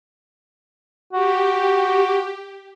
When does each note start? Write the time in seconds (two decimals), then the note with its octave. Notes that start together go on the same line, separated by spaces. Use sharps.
1.13 F#4 G4